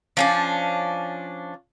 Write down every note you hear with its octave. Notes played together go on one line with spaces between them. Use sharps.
F3 C#4 D4